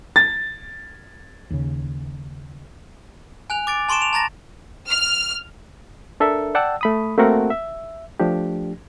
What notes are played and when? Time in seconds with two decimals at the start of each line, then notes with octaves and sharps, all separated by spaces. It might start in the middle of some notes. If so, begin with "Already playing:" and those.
0.16 A6
1.50 D#2 C#3
3.50 G#5 F#6 F7
3.67 D6 A6 D7
3.89 A5 C6 C#6 D7 E7
4.00 D7 F7
4.13 A5 A#5 A6 A#6
4.88 F6
6.20 D4 A4 A#4 E5
6.55 D5 F#5 G5 A5 E6
6.81 A3 B5 D#6
7.17 A3 A#3 C4 F#4 A#4 F#5
7.50 E5
8.20 F3 A3 D4 G4